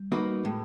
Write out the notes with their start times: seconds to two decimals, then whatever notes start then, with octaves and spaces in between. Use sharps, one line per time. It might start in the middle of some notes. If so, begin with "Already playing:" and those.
Already playing: G3
0.12 A#3 D#4 F#4 B4
0.44 A2 G#3